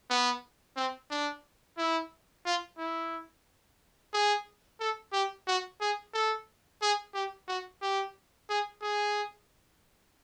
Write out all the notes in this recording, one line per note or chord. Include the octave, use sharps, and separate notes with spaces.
B3
C4
D4
E4
F4
E4
G#4
A4
G4
F#4
G#4
A4
G#4
G4
F#4
G4
G#4
G#4